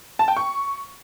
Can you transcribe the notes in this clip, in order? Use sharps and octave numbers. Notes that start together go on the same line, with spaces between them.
A5
G5
C#6